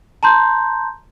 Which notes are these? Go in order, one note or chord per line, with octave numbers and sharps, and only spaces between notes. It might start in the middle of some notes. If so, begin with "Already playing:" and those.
A5 A#5 C6 G6